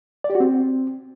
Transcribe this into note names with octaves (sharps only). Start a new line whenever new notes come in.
D5
G4
F#4
C4